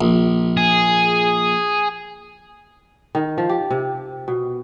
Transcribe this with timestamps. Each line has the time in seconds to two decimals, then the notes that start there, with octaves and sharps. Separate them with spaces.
0.01 A#1
0.57 G#4
3.15 D#3
3.38 F3
3.49 G4
3.70 C3
4.28 B2